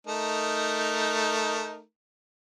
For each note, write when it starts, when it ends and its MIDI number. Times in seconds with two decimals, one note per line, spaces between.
0.07 1.81 57
0.07 1.81 63
0.07 1.81 70